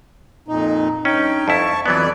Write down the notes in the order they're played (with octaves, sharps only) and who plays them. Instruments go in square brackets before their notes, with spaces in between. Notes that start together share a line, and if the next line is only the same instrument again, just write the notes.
[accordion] F2 A#2 D#4
[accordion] G2 D#4 G5 [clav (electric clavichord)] C#4
[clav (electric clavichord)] F2 E4 [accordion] A5 C#6
[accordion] F2 D5 [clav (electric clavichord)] E3 F#3 B3